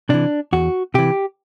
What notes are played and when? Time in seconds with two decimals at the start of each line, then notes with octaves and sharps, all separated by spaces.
0.09 C3 E3 D4
0.53 E2 F#4
0.94 C3 E3 G4